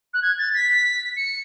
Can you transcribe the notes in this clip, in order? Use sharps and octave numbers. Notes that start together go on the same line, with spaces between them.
F#6
G#6
A6
B6
C#7